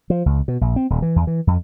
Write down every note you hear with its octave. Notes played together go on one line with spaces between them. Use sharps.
F3
C#2
B2
A#1
C4
D#1
E3
E2
E3
F2